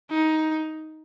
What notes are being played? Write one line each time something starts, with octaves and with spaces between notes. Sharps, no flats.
D#4